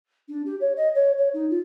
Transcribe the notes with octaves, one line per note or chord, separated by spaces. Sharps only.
D4
G4
C#5
D#5
C#5
C#5
D#4
F4